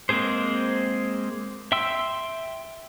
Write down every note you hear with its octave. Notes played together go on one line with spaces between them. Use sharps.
G#3 A#3 C4 G#4 C5
E5 G5 C6 E6